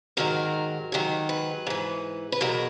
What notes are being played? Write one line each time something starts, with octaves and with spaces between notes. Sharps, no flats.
G#2 D#3 F#3 A#4
G#2 D#3 F#3
B4
G#2 E3
B4
E2 B2 F#3 A#4